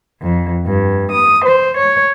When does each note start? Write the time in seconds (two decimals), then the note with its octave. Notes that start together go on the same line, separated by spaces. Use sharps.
0.23 F2
0.67 G2
1.13 D#6
1.45 C5
1.78 C#5